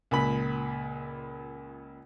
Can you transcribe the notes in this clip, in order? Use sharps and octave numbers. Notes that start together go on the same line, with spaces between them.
C#2 A#2 B5